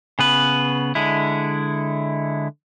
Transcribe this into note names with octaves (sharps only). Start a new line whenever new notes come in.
C#3 B3 B4
D3 G#3 E4